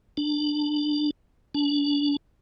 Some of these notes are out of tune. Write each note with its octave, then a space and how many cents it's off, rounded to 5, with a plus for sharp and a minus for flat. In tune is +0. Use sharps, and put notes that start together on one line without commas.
D4 +15
D4 -30